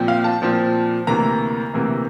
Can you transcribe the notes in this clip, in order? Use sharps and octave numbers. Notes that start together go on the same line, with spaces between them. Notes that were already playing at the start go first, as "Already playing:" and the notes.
Already playing: A#2 F3 C4
F5
A5
A#2 F3 C4
D2 C3 E3 A#3 A#5
D2 C3 E3 A#3